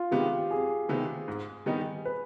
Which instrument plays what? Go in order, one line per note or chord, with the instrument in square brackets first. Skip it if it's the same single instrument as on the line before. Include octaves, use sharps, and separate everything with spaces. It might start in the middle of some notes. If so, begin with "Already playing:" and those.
Already playing: [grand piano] F4
[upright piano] C3 D#3 G#3 B3 [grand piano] G4
[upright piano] F2 [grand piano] G#4
[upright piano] C3 D#3 G#3 B3
G#2
D#3 G3 B3 D#4
[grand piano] B4